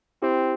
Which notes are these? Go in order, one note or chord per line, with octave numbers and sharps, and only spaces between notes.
C4 E4 G4